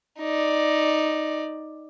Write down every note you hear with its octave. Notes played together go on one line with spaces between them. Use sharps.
D#4 D5